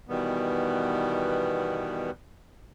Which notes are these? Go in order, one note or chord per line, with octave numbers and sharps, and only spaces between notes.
B2 D#3 E3 G3 B3